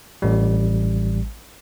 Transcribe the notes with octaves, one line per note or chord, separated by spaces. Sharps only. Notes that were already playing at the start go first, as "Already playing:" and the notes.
A1 G3